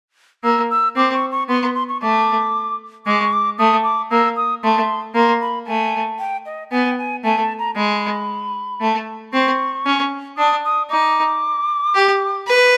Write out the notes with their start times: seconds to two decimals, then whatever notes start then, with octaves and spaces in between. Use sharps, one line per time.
0.44 A#3 E6
0.70 E6
0.96 C4 D6
1.14 C#6
1.32 C#6
1.48 B3 C6
1.62 C6
1.75 C6
1.89 C#6
2.02 A3 D6
3.06 G#3 D6
3.20 C#6
3.33 D6
3.58 A3 D#6
3.84 D6
4.11 A#3 E6
4.36 D#6
4.63 A3 C6
5.14 A#3 C6
5.41 B5
5.67 A3 G#5
6.19 G5
6.46 D#5
6.71 B3 G#5
6.92 G5
6.98 G#5
7.24 A3 G#5
7.41 A5
7.59 A#5
7.76 G#3 B5
8.81 A3
9.33 C4 C#6
9.86 C#4
10.37 D4 D#6
10.64 D#6
10.90 D#4 D6
11.94 G4
12.47 B4